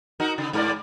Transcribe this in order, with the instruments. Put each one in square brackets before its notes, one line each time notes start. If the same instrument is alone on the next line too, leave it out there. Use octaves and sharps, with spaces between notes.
[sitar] D#4 F#4 A#4
C#3
G#2 A#4 D5